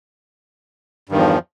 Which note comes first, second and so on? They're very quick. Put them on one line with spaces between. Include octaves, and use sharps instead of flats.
G2 D#3 E2 F3